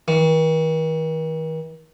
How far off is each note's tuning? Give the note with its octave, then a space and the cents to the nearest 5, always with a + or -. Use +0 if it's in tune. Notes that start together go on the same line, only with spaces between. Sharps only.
D#3 +45